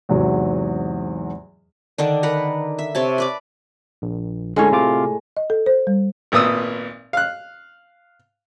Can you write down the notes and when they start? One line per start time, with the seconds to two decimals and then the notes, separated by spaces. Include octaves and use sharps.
0.09 E2 G#2 C3 F#3
1.98 D3 D#3 D4
2.23 A#4 B4 F#5 A#5
2.79 E5
2.95 C3 C#5 A5
3.18 B4 D5 D6
4.02 A#1
4.56 A2 D3 G#3 C#4 C#5
4.72 C3 F4 D6
5.37 D#5
5.50 A4
5.66 C5
5.87 G3
6.32 G#1 A#2 B3 D#6 E6
7.13 F5 F#6